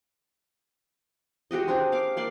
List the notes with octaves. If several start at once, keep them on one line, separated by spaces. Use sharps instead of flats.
G#3 F#4 G4 D#5
G#3 C4 D4 G4
F5 D6
A#3 D5 C6 D6